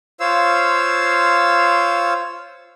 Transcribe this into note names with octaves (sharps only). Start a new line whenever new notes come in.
F4 C5 C#5 F5 E6